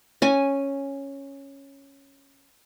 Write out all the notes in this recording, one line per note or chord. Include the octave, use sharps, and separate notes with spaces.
C#4 G#5